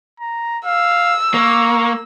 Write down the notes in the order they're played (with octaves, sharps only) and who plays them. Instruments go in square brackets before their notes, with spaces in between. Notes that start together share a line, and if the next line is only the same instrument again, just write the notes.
[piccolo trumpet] A#5
[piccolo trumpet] F5 [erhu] E6
[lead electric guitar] A#3 [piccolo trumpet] C#6